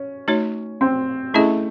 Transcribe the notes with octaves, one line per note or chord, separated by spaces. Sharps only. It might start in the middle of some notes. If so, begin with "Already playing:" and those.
Already playing: C#4
A3 D#4 F#4 C#5
C4
A3 C#4 E4 G#4 D#5